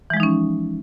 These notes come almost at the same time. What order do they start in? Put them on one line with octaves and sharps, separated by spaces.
E3 G#3 F3 D#4 C#4